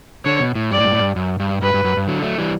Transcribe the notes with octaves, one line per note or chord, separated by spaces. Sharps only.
D3 C#5
B2
A2
G2 D5
A2
G2
A2
G2
F#2
G2
G2 B4
G2
F#2
G2
D3 F#3
F#3 A3
E3 G3